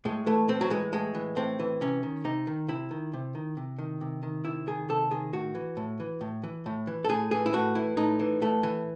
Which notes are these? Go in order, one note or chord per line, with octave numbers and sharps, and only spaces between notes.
A2 G#3
E3 A3
A2 C4
F#3
E3 G#3
A2 G#3
E3
A2 C4
E3
C3 C#4
D#3
C3 D#4
D#3
C3 E4
D#3
C3
D#3
C3
D#3
C3
D#3
C3 E4
D#3 G#4
C3 A4
D#3 G#4
A2 F#4
E3
A2
E3
A2
E3
A2
E3
A4
A2 G#4
E3 G#4
E4
A2 F#4
E3 E4
A2 D#4
E3
A2 A3
E3